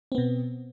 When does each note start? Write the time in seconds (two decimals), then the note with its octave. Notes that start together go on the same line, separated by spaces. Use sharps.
0.12 C4
0.15 B3
0.18 B2